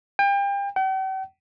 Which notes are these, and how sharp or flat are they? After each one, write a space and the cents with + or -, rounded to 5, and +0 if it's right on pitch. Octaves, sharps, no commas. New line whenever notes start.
G5 +35
G5 -45